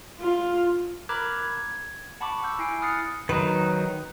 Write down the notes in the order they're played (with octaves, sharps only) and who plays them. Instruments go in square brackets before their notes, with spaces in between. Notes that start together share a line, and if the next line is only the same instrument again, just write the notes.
[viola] F4
[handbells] A#4 A#5 B5 D6 F#6 G#6
G#6
F#5 A5 B5 C#6 D6
F#5 E6 G6
E4 G#5 C7 D7
D#6 F6 F#6 A6 C7 C#7
[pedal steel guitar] D#3 F#3 D#4 [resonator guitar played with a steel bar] B4